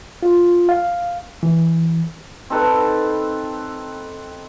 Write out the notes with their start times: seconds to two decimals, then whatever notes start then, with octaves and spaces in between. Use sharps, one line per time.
0.23 F4
0.69 F5
1.43 E3
2.50 C4 D#4 A4 B4